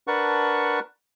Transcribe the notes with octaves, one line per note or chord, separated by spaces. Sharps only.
D4 A#4 B4 F#5 A5 C#6